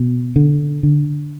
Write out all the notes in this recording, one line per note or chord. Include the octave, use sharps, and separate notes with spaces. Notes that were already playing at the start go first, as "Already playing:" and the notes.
Already playing: B2
D3
D3